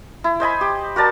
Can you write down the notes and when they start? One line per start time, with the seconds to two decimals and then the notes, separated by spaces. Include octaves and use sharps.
0.24 E4
0.40 C5 D#5 G#5 B5
0.61 G4
0.96 F#4 A#4 D5 A5